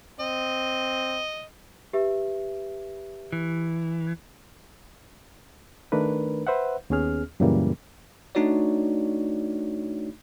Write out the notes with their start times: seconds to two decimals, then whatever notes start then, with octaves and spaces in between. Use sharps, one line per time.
0.20 C4 D#5
1.93 G4 B4 E5
3.32 E3
5.92 D#3 A3 D4 A#4 B4
6.47 B4 C5 E5 F#5
6.90 D#2 B3 C#4 G#4 F6
7.40 F#2 A#2 C#3 E3 G3 A#3
8.35 A3 D4 D#4 F#4 C#5 D5